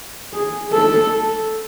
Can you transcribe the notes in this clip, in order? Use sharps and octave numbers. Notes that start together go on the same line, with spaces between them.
G#4
A4